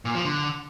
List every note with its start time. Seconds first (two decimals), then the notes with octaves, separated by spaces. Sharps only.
0.05 A#2
0.15 F3
0.25 D3